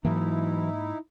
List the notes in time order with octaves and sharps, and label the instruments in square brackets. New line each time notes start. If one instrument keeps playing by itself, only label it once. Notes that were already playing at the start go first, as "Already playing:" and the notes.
[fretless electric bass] G#2 A#3 [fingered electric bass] E3 F#3 [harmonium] D#4 E4